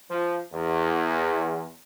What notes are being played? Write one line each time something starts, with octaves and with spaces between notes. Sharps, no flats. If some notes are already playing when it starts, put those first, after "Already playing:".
F3
E2